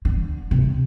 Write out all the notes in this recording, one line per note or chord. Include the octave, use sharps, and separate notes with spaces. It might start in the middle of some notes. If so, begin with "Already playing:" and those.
D3
C3